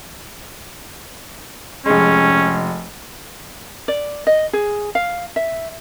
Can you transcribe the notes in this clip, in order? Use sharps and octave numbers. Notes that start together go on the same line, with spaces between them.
F1 G#3 C#4
D5
D#5
G#4
F5
E5